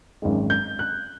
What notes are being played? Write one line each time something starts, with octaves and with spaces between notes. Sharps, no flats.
G#1 F#2 D#3 G#3
G6
F#6